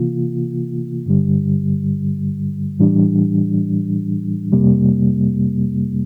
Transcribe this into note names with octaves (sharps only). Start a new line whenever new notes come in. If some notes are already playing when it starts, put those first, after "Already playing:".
Already playing: C3 E3 A#3 F4
G2 D3 G3
A2 E3 G3 D4
F2 C3 G3 A#3